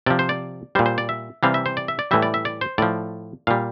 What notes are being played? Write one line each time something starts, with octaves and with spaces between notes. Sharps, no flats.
C3 F3 D5
C5
D5
A#2 G3 C5
C5
D5
E5
C3 E3 G3 F5
E5
C5
D5
E5
D5
A2 E3 G3 E5
D5
E5
D5
C5
A2 F3 D5
A#2 G3 F5